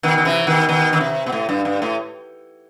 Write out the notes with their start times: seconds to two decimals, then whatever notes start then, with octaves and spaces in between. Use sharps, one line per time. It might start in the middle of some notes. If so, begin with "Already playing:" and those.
0.03 B2 D#3
0.18 D#3
0.25 C3 E3
0.47 B2 D#3
0.69 B2 D#3
0.93 D#3
1.01 C3
1.26 B2
1.32 A2
1.49 G2
1.65 G2
1.82 A2